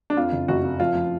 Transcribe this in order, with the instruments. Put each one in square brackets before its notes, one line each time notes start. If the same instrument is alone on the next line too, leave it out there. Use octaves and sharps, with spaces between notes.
[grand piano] D4
F2 F4
F#1
F#1 F#4
F2
F3 F4
F3